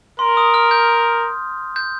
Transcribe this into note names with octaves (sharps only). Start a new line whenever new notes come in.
A#4 C6
D#6
F6
G6
G6